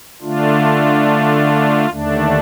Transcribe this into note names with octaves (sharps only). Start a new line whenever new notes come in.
D3 A3 D4 F4
D#2 D3 A3 D4